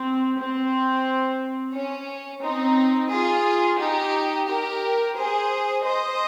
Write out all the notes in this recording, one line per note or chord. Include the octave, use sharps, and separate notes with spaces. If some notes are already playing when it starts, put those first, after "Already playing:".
Already playing: C4
C4
C#4
C4 D#4
F4 G#4
D#4 G4
G4 A#4
G#4 C5
C5 D#5